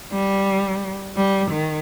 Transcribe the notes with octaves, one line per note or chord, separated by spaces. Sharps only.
G3
G3
D#3